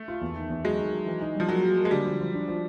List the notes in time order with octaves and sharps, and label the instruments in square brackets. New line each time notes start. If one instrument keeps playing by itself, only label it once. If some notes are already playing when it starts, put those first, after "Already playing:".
Already playing: [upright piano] A3
[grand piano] F4
E2
D#3
E2
[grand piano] F#3 [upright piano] G#3
[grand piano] D#3
F#3
E3
D#4
[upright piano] F3 [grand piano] G3
[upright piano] F#3 [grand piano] A#3
[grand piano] G3
A#3
[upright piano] G#3
[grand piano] D3 [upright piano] G3
[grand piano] F3
F3
D4
F3